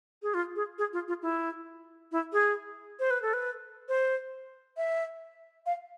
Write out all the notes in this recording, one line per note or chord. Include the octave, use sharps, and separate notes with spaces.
G#4
F4
G#4
G#4
F4
F4
E4
E4
G#4
C5
B4
A4
B4
C5
E5
F5